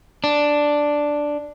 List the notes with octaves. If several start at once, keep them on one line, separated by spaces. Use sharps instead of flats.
D4